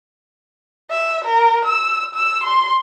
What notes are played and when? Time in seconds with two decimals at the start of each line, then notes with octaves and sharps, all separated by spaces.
0.90 E5
1.24 A#4
1.65 E6
2.14 E6
2.43 C6